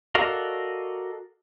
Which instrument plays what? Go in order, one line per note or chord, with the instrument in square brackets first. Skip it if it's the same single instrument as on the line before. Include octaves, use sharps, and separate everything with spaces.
[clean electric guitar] F#4 A4 A#4 D5 D#5 F5